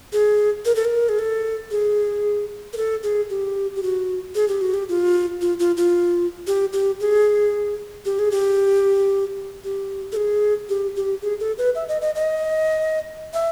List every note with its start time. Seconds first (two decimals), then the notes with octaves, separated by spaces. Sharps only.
0.13 G#4
0.65 A#4
0.76 A4
0.85 A#4
1.09 G#4
1.19 A4
1.71 G#4
2.73 A#4
2.77 A4
3.03 G#4
3.30 G4
3.76 G4
3.83 F#4
4.35 G#4
4.48 G4
4.61 F#4
4.74 G4
4.89 F4
5.41 F4
5.59 F4
5.77 F4
6.47 G4
6.73 G4
7.00 G#4
8.05 G4
8.19 G#4
8.31 G4
9.64 G4
10.12 A4
10.16 G#4
10.69 G4
10.96 G4
11.22 G#4
11.40 A4
11.58 B4
11.75 E5
11.88 D#5
12.02 D#5
12.15 D#5
13.34 E5